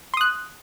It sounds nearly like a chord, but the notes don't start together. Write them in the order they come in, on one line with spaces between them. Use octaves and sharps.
C6 D#6 F#6